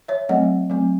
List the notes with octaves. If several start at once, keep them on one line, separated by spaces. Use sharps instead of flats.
C#5 E5
F#3 A3 C4 D#5 F#5
F#3 A3 C4